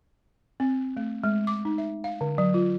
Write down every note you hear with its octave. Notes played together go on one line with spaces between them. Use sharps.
C4
A3
G#3
D6
D#4
E5
F5
D3
F#3
F4